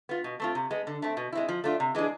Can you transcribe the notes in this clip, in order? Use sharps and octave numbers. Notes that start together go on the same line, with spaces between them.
B3 F4
B2
A3 C4 F4
C3
G#3 B3
D3
A3 C4
B2
G#3 C4 E4
F3
A3 D4 F4
C3
E3 G#3 D4 G#4